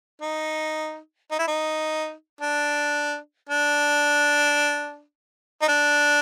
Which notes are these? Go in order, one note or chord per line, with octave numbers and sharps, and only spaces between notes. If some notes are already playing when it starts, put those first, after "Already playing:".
D#4
D#4
E4
D#4
D4
D4
D#4
D4